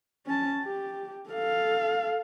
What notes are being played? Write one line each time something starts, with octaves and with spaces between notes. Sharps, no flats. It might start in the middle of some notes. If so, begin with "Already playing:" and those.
C#4 A5
G4
A4 F5